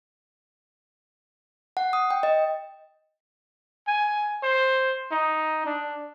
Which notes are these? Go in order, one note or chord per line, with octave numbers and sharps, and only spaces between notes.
F#5
D#6
G5
D#5
G#5
C5
D#4
D4